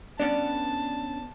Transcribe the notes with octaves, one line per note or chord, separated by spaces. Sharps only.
B3 C#4 D4 D5 A5